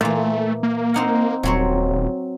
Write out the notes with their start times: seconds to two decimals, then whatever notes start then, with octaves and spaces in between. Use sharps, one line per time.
0.01 A#2 E3 A3
0.63 A#3
0.94 C4 D#4 F#5
1.43 D#1 F#3 C4 C#5